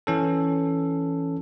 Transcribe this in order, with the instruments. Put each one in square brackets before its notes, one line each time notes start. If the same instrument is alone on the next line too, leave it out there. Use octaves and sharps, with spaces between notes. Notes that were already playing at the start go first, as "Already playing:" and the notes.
[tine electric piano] E3 C#4 A4